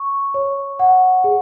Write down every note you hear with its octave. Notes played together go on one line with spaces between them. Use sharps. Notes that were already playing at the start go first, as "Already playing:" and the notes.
Already playing: C#6
C#5
F#5
G#4